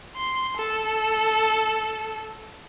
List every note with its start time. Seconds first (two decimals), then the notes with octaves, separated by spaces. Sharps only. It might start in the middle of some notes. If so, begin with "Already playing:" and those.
0.16 C6
0.57 A4